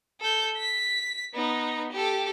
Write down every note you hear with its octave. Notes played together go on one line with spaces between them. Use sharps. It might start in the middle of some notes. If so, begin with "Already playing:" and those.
A4 G6
B6
B3 D#4
G4 A4